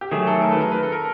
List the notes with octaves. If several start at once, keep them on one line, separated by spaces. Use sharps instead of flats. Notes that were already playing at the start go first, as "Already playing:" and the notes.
G4
D#3 F#3 A3 G#4
A4
A#4
B4
A#4
B4
A4
A#4